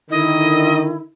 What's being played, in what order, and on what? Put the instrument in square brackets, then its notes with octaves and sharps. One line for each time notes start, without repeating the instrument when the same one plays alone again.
[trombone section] D3 D#3 [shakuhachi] E4 [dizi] D#5